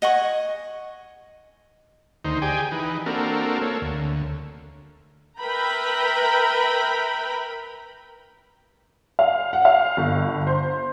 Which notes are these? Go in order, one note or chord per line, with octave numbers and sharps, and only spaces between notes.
D#5 F#5 G#5 C#6
D2 D#3 D#4 C5
G4 G#4 D5 G5 G#5
E3 D#4 B4
A#3 C4 D4 F#4 A4 A#4
A#3 A4 C#5
D2
A#4 B4 E5 G5 A#5 B5
F5
F#5
F5
G1
C5